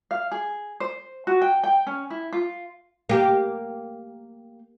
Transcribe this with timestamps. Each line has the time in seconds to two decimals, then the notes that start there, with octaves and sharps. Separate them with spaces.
0.11 F5
0.31 G#4
0.80 C5
1.27 F#4
1.41 G5
1.64 G5
1.87 C#4
2.10 E4
2.33 F4
3.09 A#3 G4